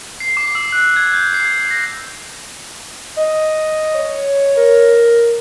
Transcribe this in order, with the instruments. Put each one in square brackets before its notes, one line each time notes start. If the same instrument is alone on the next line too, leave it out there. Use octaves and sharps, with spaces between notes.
[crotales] C7
D6
E6
F#6
G#6
G6
C7
G#6
A#6
[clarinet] D#5
[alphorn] C#5
[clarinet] A#4